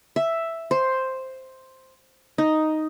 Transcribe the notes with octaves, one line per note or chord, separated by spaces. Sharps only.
E5
C5
D#4